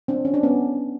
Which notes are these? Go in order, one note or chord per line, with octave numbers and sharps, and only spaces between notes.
C4 D4
C#4
D4
B3 C#4